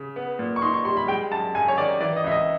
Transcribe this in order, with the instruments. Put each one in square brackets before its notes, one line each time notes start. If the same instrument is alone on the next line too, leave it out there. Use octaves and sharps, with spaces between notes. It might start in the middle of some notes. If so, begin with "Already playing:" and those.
Already playing: [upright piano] C#3
B3
A#2
C#6
D#4 C6
C#6
G3 C6
B5
G#3 G5
F#2 A5
F#2 G#5
C#5
D#3 D5
E3 D5
D#5
C#2 E5
D#5